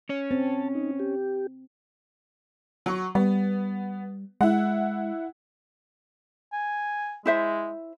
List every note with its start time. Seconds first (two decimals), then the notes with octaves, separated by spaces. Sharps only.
0.09 C#4 C#5
0.31 C4 A5
0.75 D#4
1.00 G4
2.86 F#3 C#6
3.15 G3 B3
4.41 G#3 E4 F#5
6.52 G#5
7.26 G#3 E4 C5 E5